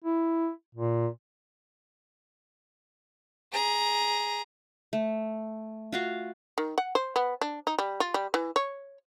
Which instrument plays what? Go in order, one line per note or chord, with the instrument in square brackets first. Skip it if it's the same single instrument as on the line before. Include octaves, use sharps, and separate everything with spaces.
[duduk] E4
A#2
[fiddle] G#4 A#5
[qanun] A3
F4 F#4 F5
[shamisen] D#3
F#5
C5
B3
D4
D#4
G3
F4
G3
E3
C#5